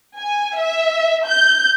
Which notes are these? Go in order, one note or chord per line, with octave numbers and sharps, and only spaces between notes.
G#5
E5
G6